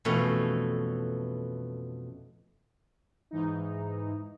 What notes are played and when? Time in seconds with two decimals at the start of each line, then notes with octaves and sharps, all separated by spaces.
0.05 F2 B2 E3 A3 C#4
3.31 G#2 E3 D#4